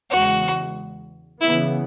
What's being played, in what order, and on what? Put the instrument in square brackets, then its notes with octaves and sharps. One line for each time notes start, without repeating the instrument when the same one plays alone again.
[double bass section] E2 C#3 G#3 [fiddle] F#4
[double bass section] C#3 E3 B3 [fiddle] E4